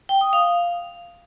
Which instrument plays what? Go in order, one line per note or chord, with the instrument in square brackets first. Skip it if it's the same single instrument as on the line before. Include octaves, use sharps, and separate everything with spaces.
[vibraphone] G5
D#6
F5